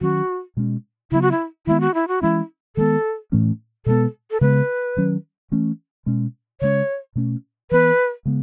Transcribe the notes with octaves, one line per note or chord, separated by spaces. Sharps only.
D#3 F#3 C#4 F#4
B2 G#3 C#4
C#3 F#3 B3 E4
F#4
E4
D#3 G#3 B3 E4
F#4
E4
F#4
E3 G#3 C#4 E4
D#3 G#3 B3 A4
A2 E3 A3 C#4
B2 G#3 B3 A4
A4
C#3 G#3 B3 B4
D#3 F#3 C#4
E3 A3 C#4
B2 G#3 C#4
C#3 G#3 C#4 C#5
B2 A3 C#4
E3 B3 B4
C#3 G#3 B3